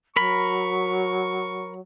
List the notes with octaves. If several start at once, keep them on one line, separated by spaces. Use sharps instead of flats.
F#3 A#4 B5 C#6